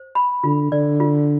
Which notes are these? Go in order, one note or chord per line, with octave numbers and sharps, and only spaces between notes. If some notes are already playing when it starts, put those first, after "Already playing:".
Already playing: C5
B5
D3 F4
D3 D5
F4